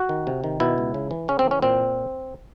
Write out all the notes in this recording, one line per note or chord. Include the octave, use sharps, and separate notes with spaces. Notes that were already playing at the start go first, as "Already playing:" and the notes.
Already playing: F#4
D#3
C3
D#3
B2 E4
C#2
C#3
E3
C#3 C#4
C4
E3
C#4
A#2 C4